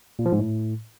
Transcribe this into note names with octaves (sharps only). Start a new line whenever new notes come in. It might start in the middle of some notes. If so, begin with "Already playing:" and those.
A#2
F3
G#2
A2